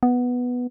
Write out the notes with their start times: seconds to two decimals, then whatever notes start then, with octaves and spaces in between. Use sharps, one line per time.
0.03 B3